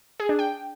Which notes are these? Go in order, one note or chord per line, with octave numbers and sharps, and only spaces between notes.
G#4
D4
G5